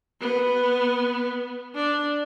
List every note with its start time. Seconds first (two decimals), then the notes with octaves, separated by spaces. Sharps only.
0.20 B3
1.75 D4